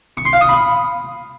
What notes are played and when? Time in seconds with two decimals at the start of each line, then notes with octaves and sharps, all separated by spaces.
0.17 C#6
0.25 C6
0.33 F5
0.41 D#6
0.49 B5